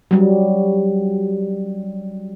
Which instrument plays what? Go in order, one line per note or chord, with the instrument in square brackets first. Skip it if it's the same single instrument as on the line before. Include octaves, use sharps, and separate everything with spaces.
[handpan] F#3 G3